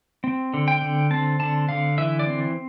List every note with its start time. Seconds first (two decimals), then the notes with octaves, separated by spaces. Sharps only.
0.24 C4
0.54 D3
0.68 G5
0.81 D3
1.11 C4 A5
1.39 D3 A5
1.69 D3 F5
1.98 E3 E5
2.19 D5
2.27 C4